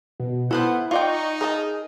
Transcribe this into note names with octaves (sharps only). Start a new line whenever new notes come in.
B2
B3 E4 A4 B4 C5 F#5
D#4 F4 D5 G5 C#6
G#4 A#4 D#5 A5